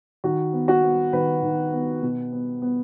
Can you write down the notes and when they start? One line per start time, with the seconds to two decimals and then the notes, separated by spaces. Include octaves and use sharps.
0.24 D#3 F#4
0.53 B3
0.68 F#4
0.83 B3
1.13 D#3 B4
1.43 D#3
1.73 B3
2.03 B2
2.32 B3
2.62 B3